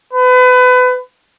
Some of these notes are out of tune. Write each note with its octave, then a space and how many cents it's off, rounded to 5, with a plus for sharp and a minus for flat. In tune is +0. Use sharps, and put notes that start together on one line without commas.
B4 +30